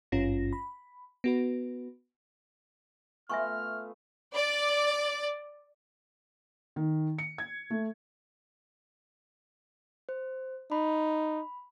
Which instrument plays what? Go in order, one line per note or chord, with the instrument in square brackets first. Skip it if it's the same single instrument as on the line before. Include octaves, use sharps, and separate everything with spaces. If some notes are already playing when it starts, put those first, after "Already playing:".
[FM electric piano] G#1 G2 C#4 F4 A#6
B5
B3 F#4 B4
[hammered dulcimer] A3 B3 F4 [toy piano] E5 G#5 C#6 [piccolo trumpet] F6
[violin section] D5
[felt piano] D#3
C#7
G#6
A3
[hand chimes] C5
[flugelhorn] D#4 [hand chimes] B5